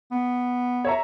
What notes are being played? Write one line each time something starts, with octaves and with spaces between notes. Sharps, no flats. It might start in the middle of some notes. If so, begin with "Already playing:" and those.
B3
C#5 E5 A#5